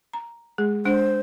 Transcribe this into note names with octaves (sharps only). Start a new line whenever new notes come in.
A#5
G#3 G#4
G#3 D4 C5